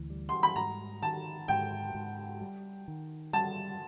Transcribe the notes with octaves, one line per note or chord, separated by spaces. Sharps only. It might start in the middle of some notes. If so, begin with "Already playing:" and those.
Already playing: D2 E3
G3
C6
B5
G#2 A#5
D#3 A5
G#2 G5
G#2
G3
D#3
G3 A5